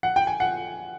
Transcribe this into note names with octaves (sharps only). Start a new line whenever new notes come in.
F#5
G5
G#5
F#5